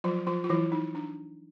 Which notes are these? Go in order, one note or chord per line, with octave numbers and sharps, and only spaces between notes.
F3 F#3 F4
F3 F4
F4
E3 F#3 E4
D#4
D4